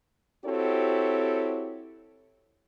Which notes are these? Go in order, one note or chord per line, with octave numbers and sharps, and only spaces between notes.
C4 E4 F#4 G4 A4 C#5